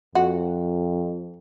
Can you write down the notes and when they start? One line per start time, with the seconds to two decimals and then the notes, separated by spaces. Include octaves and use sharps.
0.15 F2 F#4